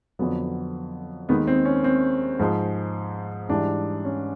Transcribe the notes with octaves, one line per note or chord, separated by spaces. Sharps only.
F2 D3 F#3 B3
D#2 D#3 G#3 B3
C4
C#4
C4
G#2 F3 G#3
G#2 E3 G3 D4
C#4